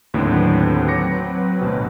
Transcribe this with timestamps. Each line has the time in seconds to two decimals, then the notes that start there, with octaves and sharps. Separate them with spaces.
0.14 D#2 A2 D3 F#3 C4 B4
0.88 D6 A#6 C#7
1.61 A1 D2 B2